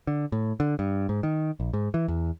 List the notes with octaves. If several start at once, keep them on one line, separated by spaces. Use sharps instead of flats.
D3
A2
D3
G2
G#2
D#3
A#1
G#2
E3
E2